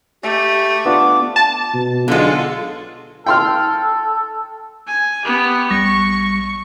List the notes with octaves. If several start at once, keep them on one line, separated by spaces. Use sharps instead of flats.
A3 G4
B3 D4 F4 D6
A5
B2
B1 D3 G#3 F4 F#4 A4
A4 G5 C6 F6
G#5
B3 G4
A#1 G3 C#6 A#6